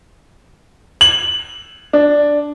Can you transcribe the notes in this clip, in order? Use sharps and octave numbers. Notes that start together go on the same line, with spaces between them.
F#7
D4